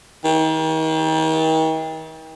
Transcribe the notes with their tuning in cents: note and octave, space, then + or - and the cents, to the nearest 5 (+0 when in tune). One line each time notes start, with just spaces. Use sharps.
D#3 +40